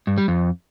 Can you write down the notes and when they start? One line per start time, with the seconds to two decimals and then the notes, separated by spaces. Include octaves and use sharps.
0.07 G2
0.18 G3
0.28 F2